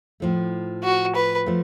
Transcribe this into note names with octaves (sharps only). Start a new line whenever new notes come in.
A2 F3 A3
F#4
B4
F3 A3